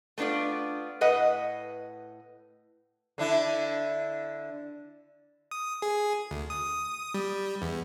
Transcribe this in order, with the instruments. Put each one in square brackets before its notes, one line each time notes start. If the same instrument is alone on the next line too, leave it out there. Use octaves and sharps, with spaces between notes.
[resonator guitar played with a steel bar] A3 B3 D4 F4 D5
A2 B4 D#5 F#5
[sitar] D3 D4 E4
[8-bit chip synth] D#6
G#4
D2
D#6
G3
E2